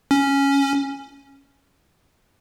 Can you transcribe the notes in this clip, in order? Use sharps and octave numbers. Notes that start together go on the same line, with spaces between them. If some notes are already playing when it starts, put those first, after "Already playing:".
C#4